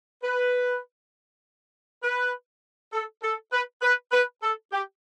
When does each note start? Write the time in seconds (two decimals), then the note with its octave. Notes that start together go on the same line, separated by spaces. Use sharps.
0.23 B4
2.03 B4
2.92 A4
3.23 A4
3.52 B4
3.82 B4
4.12 B4
4.42 A4
4.72 G4